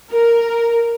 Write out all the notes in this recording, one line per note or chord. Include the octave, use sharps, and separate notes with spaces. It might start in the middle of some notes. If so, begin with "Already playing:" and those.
A#4